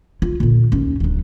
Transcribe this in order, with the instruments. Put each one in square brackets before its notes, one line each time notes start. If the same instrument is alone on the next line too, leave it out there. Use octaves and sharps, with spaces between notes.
[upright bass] F4
A#2 D3
D#2 C#4
D1 F#3